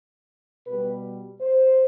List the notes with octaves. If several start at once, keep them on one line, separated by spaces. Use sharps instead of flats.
B2 G3 B4
C5